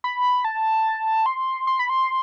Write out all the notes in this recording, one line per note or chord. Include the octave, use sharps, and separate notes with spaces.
B5
A5
C6
C6
B5
C6